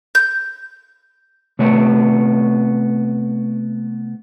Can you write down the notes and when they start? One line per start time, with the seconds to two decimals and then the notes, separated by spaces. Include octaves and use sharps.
0.15 G6
1.59 C3 A3 B3 C#5